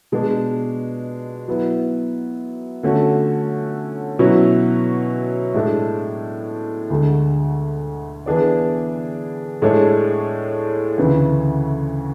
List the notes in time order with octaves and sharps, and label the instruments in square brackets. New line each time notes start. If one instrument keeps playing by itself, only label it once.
[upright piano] B2 G#3 D4
F#3 B3 E4
D3 A3 C#4 F#4
B2 F#3 C#4 E4
A2 G#3 D4
D2 D3 G#3
E3 B3 D4 G#4 D5
A2 G#3 D4 G#4 C#5
D2 C#3 E3